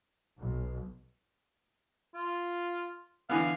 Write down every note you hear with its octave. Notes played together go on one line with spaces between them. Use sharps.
B1
F4
D3 E3 B3 F5